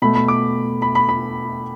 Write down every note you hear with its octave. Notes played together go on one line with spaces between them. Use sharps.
B2 A3 B5
B5
D6
B5
B5
B5